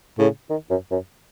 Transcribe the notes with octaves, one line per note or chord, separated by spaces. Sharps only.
A2 C#3
D#3
F#2
F#2